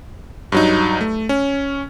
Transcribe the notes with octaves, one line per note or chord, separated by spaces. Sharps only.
G2 F#3 D#4
A3
C#4